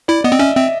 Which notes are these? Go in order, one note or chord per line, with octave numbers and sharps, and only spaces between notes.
E4 D5
B3 D#5
C4
C#4 E5
C4 E5